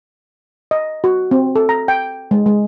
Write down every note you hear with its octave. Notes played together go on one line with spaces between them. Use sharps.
D#5
F#4
C4
A4
A#5
G5
G#3
G#3